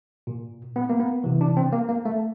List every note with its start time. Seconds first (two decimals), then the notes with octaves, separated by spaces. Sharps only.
0.27 A#2
0.76 B3
0.89 A#3
1.00 B3
1.24 C3 E3
1.41 D4
1.57 C4
1.72 A#3
1.89 A#3
2.05 A3